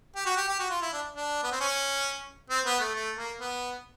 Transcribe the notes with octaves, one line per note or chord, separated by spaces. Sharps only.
G4
F#4
G4
G4
F#4
F4
E4
D4
D4
B3
C4
C#4
C4
B3
A3
A3
A#3
B3